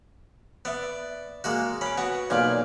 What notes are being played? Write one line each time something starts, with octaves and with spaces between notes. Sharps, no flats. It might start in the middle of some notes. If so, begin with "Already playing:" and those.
B3 D5 E5
G#3 A#3 F#4
C#4 B5 D6
B3 F#4
B1 A#2 D5 F5 G#5